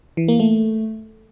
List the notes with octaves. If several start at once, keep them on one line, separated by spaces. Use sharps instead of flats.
E3
A#3
A3